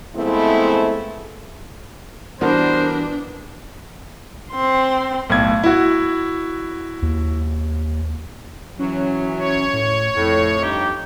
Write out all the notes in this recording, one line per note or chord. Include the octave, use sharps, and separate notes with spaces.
F3 G#3 A3 B3 C4 E4
E3 G3 B3 D4 F#4 A#4 C5 A5
C4 C6
B1 A2 G#6
E4 F#4
D#2
E3 F#3 C#4
C#5
A2
F2 A2
G2 D#4 G4